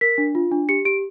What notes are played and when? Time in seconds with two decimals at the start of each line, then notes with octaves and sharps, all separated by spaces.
0.01 A#4 B6
0.18 D4
0.35 F4
0.52 D4
0.69 G4 C#7
0.85 G4 D7